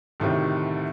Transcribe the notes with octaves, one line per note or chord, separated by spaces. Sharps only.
D2 A2 C3 D#3